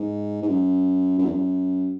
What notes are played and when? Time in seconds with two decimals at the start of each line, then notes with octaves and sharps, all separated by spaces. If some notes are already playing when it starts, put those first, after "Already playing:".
Already playing: G#2
0.42 G#2
0.48 F#2
1.18 F#2
1.26 E2
1.33 F#2